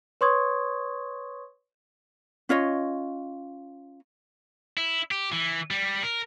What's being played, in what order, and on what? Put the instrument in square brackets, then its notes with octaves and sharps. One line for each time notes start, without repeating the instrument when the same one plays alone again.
[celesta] B4 C#5 C6 C#6 D#6 G#6
[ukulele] C#4 F4 C#5 D#5
[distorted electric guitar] E4
G4
E3
G3
A#4